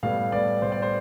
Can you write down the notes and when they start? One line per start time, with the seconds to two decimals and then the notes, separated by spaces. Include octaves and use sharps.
0.03 A2 G3 B3 F5
0.32 A2 G3 B3 D5
0.62 A2 G3 B3 C5
0.72 D5
0.82 C5